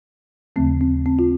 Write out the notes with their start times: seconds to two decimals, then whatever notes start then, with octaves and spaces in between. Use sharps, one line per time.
0.56 D#2 C#3 F3 A3 C4
0.81 C4
1.06 C4
1.19 F4